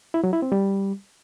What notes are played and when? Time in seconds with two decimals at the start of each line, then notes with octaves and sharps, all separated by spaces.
0.14 E4
0.24 F#3
0.33 E4
0.42 C4
0.52 G3